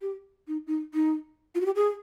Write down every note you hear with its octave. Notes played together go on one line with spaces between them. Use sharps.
G4
D#4
D#4
D#4
F4
F#4
G4
G#4